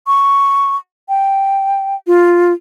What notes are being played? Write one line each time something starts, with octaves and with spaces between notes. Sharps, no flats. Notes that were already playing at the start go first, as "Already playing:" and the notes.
C#6
G5
F4